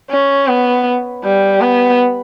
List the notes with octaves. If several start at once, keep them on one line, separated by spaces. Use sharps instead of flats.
C#4
B3
G3
B3